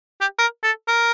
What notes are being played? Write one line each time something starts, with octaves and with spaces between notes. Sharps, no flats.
G4
A#4
A4
A#4